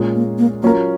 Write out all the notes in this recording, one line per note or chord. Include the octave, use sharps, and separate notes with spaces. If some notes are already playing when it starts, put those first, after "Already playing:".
Already playing: A#2 G#3 C#4 F4
A#3
A#3
F#3 A#3 C#4 F4 A#4